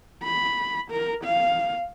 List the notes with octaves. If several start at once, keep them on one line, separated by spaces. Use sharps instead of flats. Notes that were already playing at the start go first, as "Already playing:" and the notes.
B5
A#4
F5